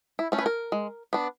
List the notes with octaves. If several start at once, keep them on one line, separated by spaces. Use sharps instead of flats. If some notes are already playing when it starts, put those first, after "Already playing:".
E4
A3 C#4
B4
A#4
G#3
B3 D4